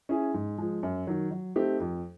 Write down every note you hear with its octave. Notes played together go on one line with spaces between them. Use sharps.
C#4 E4 G#4
G#2
F3 G#3
F#2
D#3 F#3
F#3
A3 C4 D#4 G4
F2